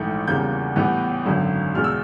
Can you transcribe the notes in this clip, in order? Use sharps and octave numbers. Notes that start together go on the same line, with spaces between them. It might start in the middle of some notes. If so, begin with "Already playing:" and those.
Already playing: A#1 G#2 E3 A3 G6
E2 C#3 E3 G3 A#3 G6
A2 E3 G3 B3
G#1 F#2 D3 F#3
E2 B2 G#3 F6
E6